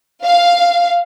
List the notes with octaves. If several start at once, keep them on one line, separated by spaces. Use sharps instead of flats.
F5